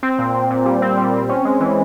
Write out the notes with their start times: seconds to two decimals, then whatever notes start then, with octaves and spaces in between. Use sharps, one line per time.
0.03 C4
0.19 A#2
0.34 A#2
0.50 A#2
0.66 G3
0.82 C4
0.97 G3
1.14 C4
1.29 C#4
1.45 G#3
1.60 E3